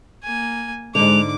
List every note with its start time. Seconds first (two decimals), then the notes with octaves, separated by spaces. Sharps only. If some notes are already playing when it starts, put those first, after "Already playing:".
0.24 A#3 G#5
0.95 G#2 D3 G#3 D6 F7